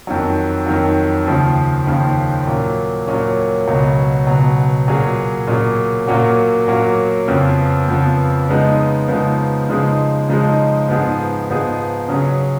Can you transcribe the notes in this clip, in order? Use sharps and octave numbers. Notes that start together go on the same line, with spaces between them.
F2 D#3 F#3
F2 D#3 F#3
D#2 C#3 F3
D#2 C#3 F3
A#2 F#3 C#4
A#2 F#3 C#4
C#2 B2 F#3
C#2 B2 F#3
A#2 F#3 C#4 G#4
A#2 F#3 C#4 G#4
A#2 F#3 A#3 C#4 F#4
A#2 F#3 A#3 C#4 F#4
F2 C#3 F3 B3
F2 C#3 F3 B3
C#3 F3 G#3 B3 D#4
C#3 F3 G#3 B3 D#4
C#3 F3 G#3 D#4 G#4
C#3 F3 G#3 D#4 G#4
G#2 F3 B3 D#4 G#4
G#2 F3 B3 D#4 G#4
C#3 F#3 C#4 G#4